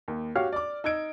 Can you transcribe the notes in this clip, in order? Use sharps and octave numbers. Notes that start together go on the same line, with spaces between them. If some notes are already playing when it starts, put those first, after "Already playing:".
D#2
F#4 G4 C#5 F5 F6
D5 D6
D#4 E6 G#6 D7